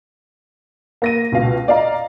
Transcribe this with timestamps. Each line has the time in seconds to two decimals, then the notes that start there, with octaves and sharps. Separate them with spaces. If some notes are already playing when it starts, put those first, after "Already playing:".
1.02 A#3 A#6 D#7
1.32 C#2 B2 F5
1.68 D5 D#5 F5 A#5